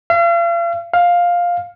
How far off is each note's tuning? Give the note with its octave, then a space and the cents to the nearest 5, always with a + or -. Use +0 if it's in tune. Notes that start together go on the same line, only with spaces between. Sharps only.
F5 -40
F5 +10